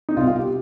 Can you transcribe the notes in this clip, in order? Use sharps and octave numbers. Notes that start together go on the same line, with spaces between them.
D#4
C2 B2 F4
F4
G4